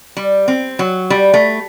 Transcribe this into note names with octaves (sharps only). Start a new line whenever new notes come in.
G3
C4
F#3
G3
A3